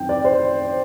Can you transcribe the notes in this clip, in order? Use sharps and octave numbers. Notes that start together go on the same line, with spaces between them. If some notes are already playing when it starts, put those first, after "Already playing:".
Already playing: F#2 D#3 C4 G5
D5
C5